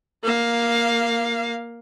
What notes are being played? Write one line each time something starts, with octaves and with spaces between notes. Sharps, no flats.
A#3 F5